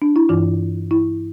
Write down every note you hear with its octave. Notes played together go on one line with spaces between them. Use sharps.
D4
E4
G2 E3 F4
E4